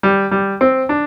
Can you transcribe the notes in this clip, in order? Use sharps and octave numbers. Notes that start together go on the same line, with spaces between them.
G3
G3
C4
D4